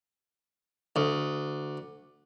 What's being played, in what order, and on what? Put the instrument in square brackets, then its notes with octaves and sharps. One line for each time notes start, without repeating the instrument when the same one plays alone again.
[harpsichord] D2